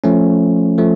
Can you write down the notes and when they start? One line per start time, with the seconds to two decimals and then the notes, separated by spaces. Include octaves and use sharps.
0.04 F3 A3 C#4
0.78 F3 A3